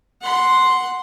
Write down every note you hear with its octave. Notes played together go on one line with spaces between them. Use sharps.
F#5 C6